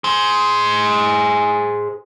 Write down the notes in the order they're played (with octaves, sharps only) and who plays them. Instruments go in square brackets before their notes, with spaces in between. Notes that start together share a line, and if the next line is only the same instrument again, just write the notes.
[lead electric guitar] G#4 C5